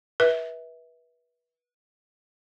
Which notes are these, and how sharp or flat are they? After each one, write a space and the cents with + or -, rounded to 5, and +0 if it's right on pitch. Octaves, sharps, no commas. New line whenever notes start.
B4 -30 E5 -20